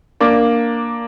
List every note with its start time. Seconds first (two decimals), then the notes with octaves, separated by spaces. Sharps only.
0.20 A#3 D4